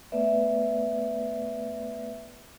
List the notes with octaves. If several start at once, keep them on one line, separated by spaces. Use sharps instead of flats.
A3 B3 B4 D5 E5